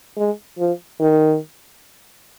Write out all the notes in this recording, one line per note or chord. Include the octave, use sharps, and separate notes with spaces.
G#3
F3
D#3